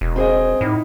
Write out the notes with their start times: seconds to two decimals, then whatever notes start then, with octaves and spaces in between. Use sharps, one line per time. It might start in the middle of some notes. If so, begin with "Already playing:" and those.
0.01 E1
0.16 C4 G#4 D#5
0.61 A2 D#4 E4